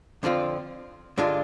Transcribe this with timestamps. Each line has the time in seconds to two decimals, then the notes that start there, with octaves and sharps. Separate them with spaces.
0.23 F2 D3 F3 C4 F4
1.18 G2 D3 G#3 D4 F4